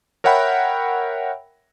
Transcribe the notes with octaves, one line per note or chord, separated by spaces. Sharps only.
A#4 C#5 E5 F#5 G5 B5